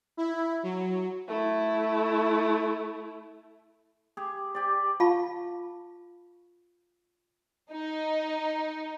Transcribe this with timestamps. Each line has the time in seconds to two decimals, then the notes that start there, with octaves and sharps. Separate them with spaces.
0.17 E4
0.63 F#3
1.28 A3 E4
4.17 G4 G#4
4.55 G4 D5
5.00 F4 F5 A5 B5 C#6
7.70 D#4